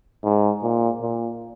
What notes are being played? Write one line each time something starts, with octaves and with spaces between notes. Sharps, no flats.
G#2
A#2
A#2